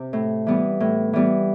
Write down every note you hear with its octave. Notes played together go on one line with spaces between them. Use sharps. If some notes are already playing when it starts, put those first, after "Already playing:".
Already playing: C3
A2
E3 G3 B3
A2
E3 G3 B3